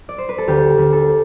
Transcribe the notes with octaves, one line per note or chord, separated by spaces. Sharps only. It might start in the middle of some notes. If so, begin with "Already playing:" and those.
D5
C5
B4
A4
D2 G4
D2
A4